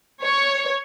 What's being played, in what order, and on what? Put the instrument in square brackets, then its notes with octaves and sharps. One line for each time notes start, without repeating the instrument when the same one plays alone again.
[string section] C#5